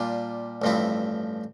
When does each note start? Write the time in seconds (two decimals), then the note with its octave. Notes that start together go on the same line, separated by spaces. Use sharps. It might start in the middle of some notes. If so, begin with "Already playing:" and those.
Already playing: A#2 G3 D4 F4
0.62 A1 G2 F3 C4 E4